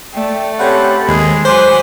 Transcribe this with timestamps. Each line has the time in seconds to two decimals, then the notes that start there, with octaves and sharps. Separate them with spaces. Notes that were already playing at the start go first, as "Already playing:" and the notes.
0.14 A3 D5 G5
0.59 C4 C#4 G4 A4 F#5 B5
1.08 D#2 G#3 G#4
1.45 F#3 B4 C5 G#5 D6